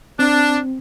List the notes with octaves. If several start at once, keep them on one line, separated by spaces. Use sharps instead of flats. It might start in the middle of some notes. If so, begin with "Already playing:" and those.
C4 D4